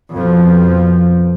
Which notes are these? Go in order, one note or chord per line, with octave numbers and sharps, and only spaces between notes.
F2 B2 F3